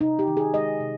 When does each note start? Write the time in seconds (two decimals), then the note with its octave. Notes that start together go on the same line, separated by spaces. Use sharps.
0.01 C3 D#4
0.19 G4
0.27 D#3
0.37 G#4
0.54 G#3 D#5
0.80 C3